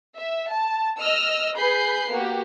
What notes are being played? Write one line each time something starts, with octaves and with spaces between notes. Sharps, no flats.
E5
A5
D#5 E6 F6
G#4 B4 B5 G6 C7
A#3 B3 F#4 G4